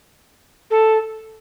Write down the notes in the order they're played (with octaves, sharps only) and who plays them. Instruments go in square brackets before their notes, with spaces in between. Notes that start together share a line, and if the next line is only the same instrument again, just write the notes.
[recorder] A4